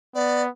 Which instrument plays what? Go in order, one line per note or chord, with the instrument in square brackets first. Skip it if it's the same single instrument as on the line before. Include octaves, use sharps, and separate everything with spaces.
[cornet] B3 [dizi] D5